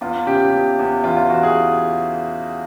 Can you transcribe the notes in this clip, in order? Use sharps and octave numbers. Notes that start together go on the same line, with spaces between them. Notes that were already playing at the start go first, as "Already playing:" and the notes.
E2 F4
C#3 G4
E2
E2
E3 F4
F4
E3 F#4
G#4